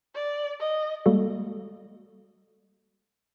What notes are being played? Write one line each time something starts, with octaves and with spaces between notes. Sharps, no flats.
D5
D#5
G3 G#3 A#3 F#4 A4